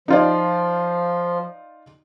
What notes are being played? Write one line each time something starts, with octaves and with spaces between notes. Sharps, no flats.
F3 D#4 F4 D5